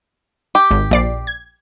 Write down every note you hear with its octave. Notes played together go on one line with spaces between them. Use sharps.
G4
G#1
A#1 D5 C7
G#6